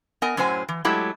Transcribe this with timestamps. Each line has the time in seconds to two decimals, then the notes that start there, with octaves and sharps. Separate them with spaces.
0.22 B3 A#4 D#5 G#5
0.37 F#2 A2 F#3 C5 G#5
0.69 E3
0.85 F#3 G#3 A3 E4 G4